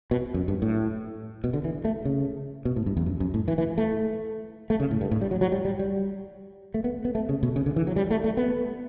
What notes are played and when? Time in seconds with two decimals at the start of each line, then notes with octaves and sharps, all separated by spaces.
0.11 B2
0.34 F#2
0.48 G2
0.62 A2
1.44 B2
1.54 D3
1.64 E3
1.85 A3
2.05 C#3
2.65 B2
2.76 A2
2.86 G2
2.97 E2
3.06 F#2
3.20 F#2
3.34 A2
3.48 E3
3.58 E3
3.78 A3
4.70 A3
4.80 C#3
4.91 A2
5.01 G2
5.11 A2
5.21 G3
5.31 F#3
5.41 F#3
5.52 G3
5.65 G3
5.79 G3
6.74 A3
6.84 B3
7.05 B3
7.15 A3
7.29 C#3
7.43 B2
7.56 C#3
7.66 D3
7.76 E3
7.87 F#3
7.96 G3
8.10 A3
8.24 A3
8.37 B3